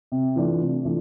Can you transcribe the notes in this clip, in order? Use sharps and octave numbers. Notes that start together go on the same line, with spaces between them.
C3
E3 A3 D4 F4
C3
E3 A3 D4 F4